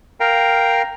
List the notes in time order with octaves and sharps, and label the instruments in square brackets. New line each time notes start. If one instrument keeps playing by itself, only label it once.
[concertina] A#4 F5 G5 A#5